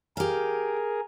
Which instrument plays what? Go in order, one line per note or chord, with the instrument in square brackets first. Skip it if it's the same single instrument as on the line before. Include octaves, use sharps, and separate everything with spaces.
[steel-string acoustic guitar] G4 F5 [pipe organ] G#4 A#4